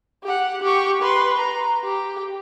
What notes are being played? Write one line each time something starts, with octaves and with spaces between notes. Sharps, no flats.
G4 F#5
G4 C#6
B4 C6
A#5
G4